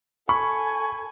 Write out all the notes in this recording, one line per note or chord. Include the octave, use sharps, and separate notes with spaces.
A4 G#5 B5 C#6